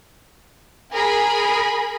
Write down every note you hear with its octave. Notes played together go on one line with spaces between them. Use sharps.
G#4 A#4 G#5 B5